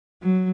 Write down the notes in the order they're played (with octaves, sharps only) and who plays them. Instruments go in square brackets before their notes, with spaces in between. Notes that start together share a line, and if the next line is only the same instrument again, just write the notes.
[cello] F#3